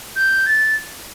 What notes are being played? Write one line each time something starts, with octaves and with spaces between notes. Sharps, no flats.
G6
A6